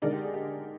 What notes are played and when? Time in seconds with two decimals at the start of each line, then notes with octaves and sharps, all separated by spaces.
0.02 D3 G#3 D4 D#4 A#4 D5
0.13 G4
0.24 G#4
0.34 G4